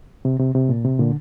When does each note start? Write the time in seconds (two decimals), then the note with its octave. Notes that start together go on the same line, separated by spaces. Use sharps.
0.25 C3
0.40 C3
0.55 C3
0.69 A#2
0.84 C3
0.99 A#2 D3